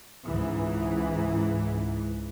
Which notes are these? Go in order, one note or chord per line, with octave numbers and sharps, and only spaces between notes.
C#2 G#2 E3